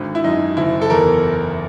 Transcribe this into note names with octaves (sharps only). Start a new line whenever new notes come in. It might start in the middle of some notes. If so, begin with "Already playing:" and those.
Already playing: G#1 D3
E4
F#2 D#4
F#1 E4
A4
E2 A#4